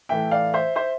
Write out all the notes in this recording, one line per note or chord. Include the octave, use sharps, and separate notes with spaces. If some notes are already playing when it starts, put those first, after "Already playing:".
A2 E3 A3 E5 G5
D5 F5
C5 E5
C5 E5